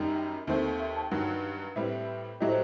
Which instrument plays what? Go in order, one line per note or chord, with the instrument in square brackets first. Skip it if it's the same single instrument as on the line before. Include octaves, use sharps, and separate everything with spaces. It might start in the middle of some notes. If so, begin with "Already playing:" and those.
Already playing: [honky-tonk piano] F#2 D#3 G3 D#4
[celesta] G5
[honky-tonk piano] D#2 D#3 A3 C4
[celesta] E5
A5
G5
[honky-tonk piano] G2 D#3 F#3 [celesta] F#5
[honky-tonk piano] A2 G3 C4 E4 B4 [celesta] E5
[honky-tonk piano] A2 F#3 A3 E4 G4 [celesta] D#5
[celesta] C5